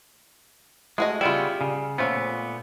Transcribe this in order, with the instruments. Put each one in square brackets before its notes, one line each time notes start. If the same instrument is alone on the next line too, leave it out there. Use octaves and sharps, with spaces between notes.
[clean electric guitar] G#3 [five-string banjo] A3 F#4 D#5
[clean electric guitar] C#3 B3 E4 [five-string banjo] G3 F4
[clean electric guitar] C#3
[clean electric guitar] A#2 A3 B3 [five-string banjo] F3 C#4